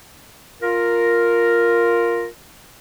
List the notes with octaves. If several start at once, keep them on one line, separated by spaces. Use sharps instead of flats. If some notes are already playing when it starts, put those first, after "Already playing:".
F4 A#4